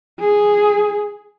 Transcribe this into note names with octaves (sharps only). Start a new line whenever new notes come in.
G#4